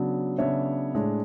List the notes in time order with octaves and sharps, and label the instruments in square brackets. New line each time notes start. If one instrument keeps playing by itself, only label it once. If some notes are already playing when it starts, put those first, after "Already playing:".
Already playing: [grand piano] C#3 F#3 B3 D4
C#3 F#3 B3 D4 C#5 E5
A2 G#3 D4